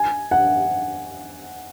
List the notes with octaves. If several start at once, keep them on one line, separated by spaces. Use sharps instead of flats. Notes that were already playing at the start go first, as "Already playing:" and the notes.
Already playing: G#5
F#5